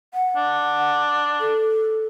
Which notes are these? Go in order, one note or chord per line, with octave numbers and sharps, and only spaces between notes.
F#5
D4
A4